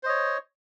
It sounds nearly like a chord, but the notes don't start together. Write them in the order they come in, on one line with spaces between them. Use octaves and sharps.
C5 D#5 C#5